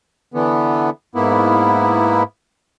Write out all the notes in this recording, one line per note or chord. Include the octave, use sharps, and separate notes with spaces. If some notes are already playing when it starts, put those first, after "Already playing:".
D3 E3 B3
G#2 A#3 B3 E4